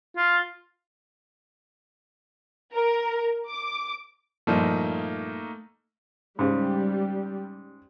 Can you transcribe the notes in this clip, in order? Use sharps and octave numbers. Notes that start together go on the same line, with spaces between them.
F4
A#4
D6
G2 A#2 F3 A3 A#3 D#4
G#2 C#3 G3